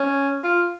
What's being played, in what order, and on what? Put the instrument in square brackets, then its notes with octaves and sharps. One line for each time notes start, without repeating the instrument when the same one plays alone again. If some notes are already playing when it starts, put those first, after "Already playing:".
Already playing: [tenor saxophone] C#4
F4